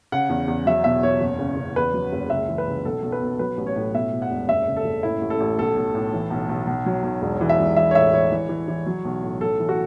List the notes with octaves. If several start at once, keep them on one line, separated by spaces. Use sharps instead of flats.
C#3 F#5
E2
E2
F#3 E5
B2 E5
E2 C#5
F#1
C#3
C#3
E2 B4
F#3
F#1
C#2 E5
E3
B4
C#2
B1 A4
B1
B4
B2
F#3 B4
A1
C#5
A2
B2 E5
B2
F#5
E1
F#1 E5
C#3
A4
F#1
A2 E4
A1
A4
A1
B1 A4
B1
A2
E3
B1
B1
B1
F#3
B1
E1
E3
E5
E1
E3 E5
C#5
A2 E5
E3 C#5
E3
E3
E3
F#3
B1
A2
B1 A4
E3
F#4